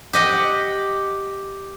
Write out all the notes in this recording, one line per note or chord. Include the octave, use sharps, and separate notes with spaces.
G4 D#5 F#5